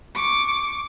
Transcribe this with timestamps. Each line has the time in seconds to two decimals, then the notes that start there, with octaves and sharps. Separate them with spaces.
0.15 C#6 D6